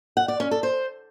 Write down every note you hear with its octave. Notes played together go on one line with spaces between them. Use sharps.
F#5
D5
C#4
A4
C5